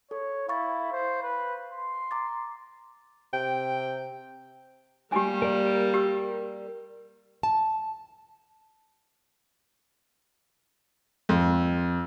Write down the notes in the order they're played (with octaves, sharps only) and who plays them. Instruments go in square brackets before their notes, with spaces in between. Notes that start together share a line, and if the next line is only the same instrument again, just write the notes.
[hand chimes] A4 [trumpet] C#5
[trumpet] E4 [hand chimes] F5 C#6 A6
[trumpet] C5
B4
C6
[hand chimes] A#5 D6 A6
[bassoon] C3 [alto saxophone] G5
[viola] G3 A#3 [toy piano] G4 G#5
[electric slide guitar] A#4 D5
[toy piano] G4 E6
[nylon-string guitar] A5
[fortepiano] F2